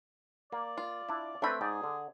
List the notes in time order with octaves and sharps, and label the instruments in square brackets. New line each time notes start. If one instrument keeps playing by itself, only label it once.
[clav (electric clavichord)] A#3 [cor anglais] D5
[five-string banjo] F4
[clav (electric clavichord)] D4 E4
[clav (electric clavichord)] A3 C4 B4 [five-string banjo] D4 B5
[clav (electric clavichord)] G#2 D5 G5 [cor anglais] G#4
[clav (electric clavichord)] D3